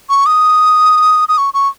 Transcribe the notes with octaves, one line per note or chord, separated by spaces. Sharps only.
C#6
D#6
D#6
C#6
C#6